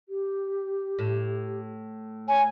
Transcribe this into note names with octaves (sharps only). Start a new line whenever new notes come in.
G4
A2
C#5 G#5